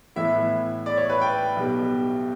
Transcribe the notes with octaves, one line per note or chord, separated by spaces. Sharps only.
A2 E3 B3 E4 E5
D5
C#5
B4
G5
B1 B2 G3 B3